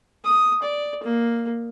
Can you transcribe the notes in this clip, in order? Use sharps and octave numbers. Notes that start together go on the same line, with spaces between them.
D#6
D5
A#3